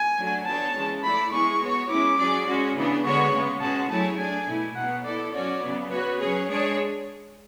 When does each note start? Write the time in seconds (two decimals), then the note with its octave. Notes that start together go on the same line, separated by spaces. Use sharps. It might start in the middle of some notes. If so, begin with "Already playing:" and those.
Already playing: G#5
0.18 F#3 A3 D4 F#4
0.46 B3 D4 A4 C#5 A5
0.75 C#3 E3 G#3
1.04 A3 E4 A4 D5 B5
1.32 G#3 B3 E4 G#4 C#6
1.61 B3 F#4 C#5
1.89 G#3 C#4 E4 D6
2.18 F#3 C#4 G#4 D5
2.47 G#3 C#4 F#4
2.75 C#3 E3 B3 D4
3.04 D3 G#3 B3 F#4 C#5 C#6
3.33 C#3 G#3 B3
3.61 B2 G#3 C#4 F#4 A5
3.90 F#3 A3 E4 G#4 C#5 A5
4.18 A3 D4 G#4 D5 G#5
4.47 B2 A3 E4
4.75 B2 F#3 B3 F#5
5.04 B3 E4 A4 D5
5.32 F#3 C#4 F#4 C#5 D5
5.61 C#3 F#3 B3
5.90 B3 F#4 B4 C#5
6.19 F#3 C#4 G#4 C#5
6.48 G#3 D4 G#4 C#5